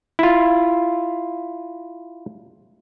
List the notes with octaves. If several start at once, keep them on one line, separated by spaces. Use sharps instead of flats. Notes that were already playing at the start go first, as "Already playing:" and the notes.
E4 F4